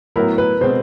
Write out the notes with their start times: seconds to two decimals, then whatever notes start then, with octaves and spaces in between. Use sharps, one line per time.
0.16 A2 F#3 B3 E4 A#4
0.38 B4
0.61 B2 G#3 C4 C5